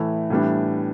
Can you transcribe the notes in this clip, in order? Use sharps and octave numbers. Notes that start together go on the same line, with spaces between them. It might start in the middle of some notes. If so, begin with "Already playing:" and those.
Already playing: A2 E3 A3
A2 E3 G3 B3 D4